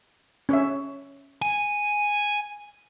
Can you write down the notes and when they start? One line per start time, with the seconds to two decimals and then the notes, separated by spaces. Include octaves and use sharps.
0.49 C#4 C#5 E5
1.42 G#5